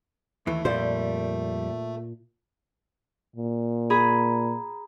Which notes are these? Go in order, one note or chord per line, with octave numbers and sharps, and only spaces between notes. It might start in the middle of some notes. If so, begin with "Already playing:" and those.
D#2 E3 A3
F2 A#2 G3 C5
A#2
G#4 A#5 B5